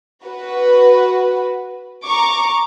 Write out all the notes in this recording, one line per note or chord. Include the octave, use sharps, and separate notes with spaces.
F#4 B4
A#5 C#6 D6